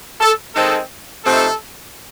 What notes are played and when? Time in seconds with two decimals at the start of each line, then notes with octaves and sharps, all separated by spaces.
0.21 A4
0.55 D#3 G#3 C4 D#4 A4
1.23 C3 F3 A3 C4 D#4 A4